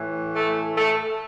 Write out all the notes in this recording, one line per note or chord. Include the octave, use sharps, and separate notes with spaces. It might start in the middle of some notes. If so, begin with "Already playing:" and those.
Already playing: A2 E3
A3
A3